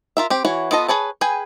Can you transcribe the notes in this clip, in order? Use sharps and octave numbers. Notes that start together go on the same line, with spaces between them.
F4 A#4 E5
C4 G4
E3 F#4 C#5
B3 F4 A4 D#5
G#4 B4 C#5 A5
G#4 B4 G5 G#5